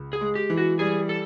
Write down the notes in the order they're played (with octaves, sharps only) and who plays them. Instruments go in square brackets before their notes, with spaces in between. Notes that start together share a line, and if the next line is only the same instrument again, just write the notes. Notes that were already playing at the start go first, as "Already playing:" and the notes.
Already playing: [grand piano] C#2
[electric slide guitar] G#4
[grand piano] G#3
[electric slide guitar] G4
[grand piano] E3
[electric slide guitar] F#4
[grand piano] G3 [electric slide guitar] G#4
[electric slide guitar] A4